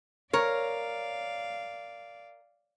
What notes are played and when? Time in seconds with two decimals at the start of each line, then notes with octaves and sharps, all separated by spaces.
0.33 A#4 C#5 D5 F5